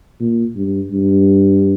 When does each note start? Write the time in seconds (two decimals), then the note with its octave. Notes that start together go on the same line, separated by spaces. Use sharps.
0.20 A#2
0.56 G2
0.91 G2